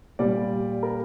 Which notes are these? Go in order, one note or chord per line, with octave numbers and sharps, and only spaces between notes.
A#2 G3 D5
A#4